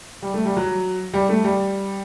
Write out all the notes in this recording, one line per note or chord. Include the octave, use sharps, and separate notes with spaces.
G3
A3
G3
F#3
G3
A3
G3